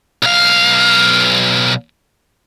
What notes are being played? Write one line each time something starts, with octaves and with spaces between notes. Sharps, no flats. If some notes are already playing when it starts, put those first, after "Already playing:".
B1 F5